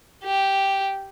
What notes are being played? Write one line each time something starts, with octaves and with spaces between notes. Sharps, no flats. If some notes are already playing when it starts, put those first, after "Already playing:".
G4